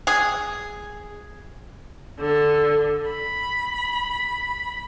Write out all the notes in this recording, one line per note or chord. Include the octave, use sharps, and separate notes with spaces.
G#4
D3
B5